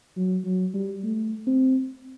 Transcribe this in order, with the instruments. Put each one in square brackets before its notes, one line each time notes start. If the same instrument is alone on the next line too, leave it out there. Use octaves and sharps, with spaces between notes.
[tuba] F#3
F#3
G3
A3
C4